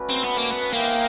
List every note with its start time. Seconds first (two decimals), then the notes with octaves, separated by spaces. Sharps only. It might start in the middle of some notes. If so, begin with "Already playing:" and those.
Already playing: A3 C#4 F#4 B4 D5
0.09 C4
0.23 B3
0.37 A#3
0.50 B3
0.72 A#3 D#4 G#4 C5 E5 G5